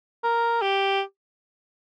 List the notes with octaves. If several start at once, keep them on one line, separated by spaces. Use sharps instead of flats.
A#4
G4